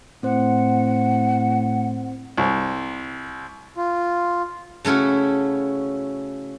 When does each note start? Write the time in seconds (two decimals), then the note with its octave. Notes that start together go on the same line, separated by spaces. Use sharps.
0.23 A2 C4 C5 F#5
2.38 C2
3.77 F4
4.85 C#3 A3 C#4 E4 F#4